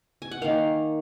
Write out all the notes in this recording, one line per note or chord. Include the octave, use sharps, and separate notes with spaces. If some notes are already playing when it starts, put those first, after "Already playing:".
G#5
F#5
D#3 A#3 F5